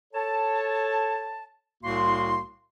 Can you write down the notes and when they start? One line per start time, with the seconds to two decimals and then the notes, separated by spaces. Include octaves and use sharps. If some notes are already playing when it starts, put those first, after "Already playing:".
0.13 A4 C#5 A5
1.83 C2 A2 A#3 F#4 C6